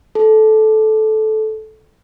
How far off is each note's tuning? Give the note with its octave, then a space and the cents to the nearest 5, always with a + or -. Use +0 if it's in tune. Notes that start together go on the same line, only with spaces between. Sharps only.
A4 -15